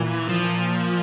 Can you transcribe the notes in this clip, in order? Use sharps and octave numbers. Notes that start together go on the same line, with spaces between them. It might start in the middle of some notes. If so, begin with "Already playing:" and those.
Already playing: A#2 E3
F3